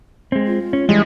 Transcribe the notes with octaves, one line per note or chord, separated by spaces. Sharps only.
G#3 C4
F4
C#4
E3 G3 G#3